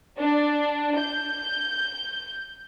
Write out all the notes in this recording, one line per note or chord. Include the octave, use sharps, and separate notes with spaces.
D4
G6